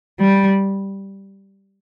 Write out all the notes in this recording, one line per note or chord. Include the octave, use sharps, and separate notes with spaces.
G3